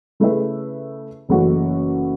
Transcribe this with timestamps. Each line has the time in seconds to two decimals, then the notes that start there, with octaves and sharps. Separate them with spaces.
0.20 C#3 A3 E4 B4 E5
1.29 F#1 F#2 E3 A3 F#4